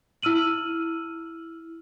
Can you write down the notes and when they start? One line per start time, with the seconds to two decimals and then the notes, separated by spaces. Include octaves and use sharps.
0.23 E4 E6 F6 D#7 F#7